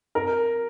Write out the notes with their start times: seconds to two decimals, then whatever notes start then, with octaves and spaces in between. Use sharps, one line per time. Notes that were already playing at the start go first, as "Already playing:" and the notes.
0.15 A#4